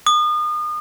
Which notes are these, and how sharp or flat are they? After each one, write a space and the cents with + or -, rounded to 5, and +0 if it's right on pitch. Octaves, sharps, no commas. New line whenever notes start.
D#6 -35